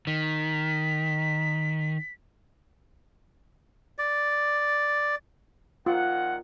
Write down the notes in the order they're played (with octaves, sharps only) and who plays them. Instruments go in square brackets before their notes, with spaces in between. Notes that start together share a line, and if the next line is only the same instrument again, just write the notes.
[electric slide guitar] D#3 [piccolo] B6
[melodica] D5
[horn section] A#2 D#3 F#5 [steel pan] F4